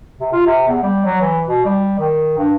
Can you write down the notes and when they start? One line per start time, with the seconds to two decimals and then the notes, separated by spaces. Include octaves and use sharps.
0.19 C3
0.33 F4
0.46 C3
0.68 E2
0.83 G3
1.05 F#3
1.21 E3
1.47 B2
1.65 G3
1.99 D#3
2.37 G2